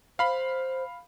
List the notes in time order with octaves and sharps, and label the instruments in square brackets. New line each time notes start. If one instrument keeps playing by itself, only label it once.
[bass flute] C5 [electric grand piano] F5 B5